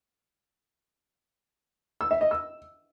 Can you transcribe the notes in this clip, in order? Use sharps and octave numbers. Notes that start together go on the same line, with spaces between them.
E6
E5
D#5
E6